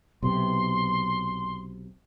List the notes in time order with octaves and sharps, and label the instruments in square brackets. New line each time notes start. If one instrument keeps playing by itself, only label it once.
[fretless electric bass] B1 C3 [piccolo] C6